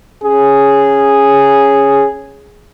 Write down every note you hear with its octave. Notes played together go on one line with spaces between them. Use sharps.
C#4 G#4